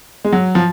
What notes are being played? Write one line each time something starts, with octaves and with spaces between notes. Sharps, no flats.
G#3
F#3
F3